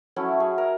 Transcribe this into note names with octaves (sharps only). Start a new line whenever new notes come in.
F#3 A3 C#4 E4
G#4
A#4